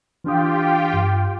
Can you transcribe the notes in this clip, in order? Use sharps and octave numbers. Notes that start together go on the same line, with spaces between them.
E3 D4 F4 G4 G5 D#6
G2